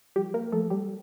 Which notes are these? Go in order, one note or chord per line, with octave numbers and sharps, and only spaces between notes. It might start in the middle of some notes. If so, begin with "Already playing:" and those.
F3 G3 G4
A#3 A#4
F3 A3 A4
G3 G4